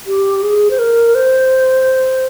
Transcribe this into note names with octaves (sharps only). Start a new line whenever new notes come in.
G4
G#4
C5
A#4
C5